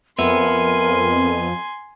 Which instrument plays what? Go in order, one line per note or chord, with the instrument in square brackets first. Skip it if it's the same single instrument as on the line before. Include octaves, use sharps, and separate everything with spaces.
[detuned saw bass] F2 [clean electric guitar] B3 E5 [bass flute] A#4 [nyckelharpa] G#5 C6